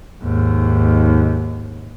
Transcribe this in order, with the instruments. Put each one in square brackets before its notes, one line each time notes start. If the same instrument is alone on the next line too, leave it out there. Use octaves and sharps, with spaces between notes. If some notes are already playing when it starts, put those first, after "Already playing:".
[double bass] D#2 G#2